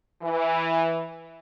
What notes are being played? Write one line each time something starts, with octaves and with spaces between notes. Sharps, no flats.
E3